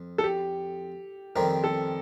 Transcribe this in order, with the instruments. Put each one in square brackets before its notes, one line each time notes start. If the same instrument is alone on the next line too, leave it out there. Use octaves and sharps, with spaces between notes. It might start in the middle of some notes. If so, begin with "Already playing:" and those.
Already playing: [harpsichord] F2
[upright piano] A4
G4
[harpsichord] F2 D#3 G3 C4 [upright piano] A#4
[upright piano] A4